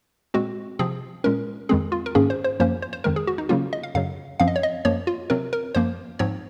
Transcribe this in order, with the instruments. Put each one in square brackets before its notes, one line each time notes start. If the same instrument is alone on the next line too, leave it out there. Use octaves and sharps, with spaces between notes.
[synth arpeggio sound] A#2 G#3 C4 F#4
C3 F3 C4 G#4
A#2 G#3 C#4 A#4
F2 D#3 G#3 C4 G#4
F4
A#4
G#2 D#3 A#3 C#4 G#4
C5
C5
F#2 F3 A#3 C#4 C5
C5
C5
F2 D#3 G#3 A#4
G#4
F#4
D#4
C#3 F#3 A#3 C#4 F4
D#5
F5
F#2 C#3 F#3 F5
F#2 F3 C4 F5
D#5
C#5
D#5
F#2 F3 A#3 C#5
F4
C3 F#3 C4 A#4
A#4
F#2 F3 A#3 C5
G#2 F3 C4 C#5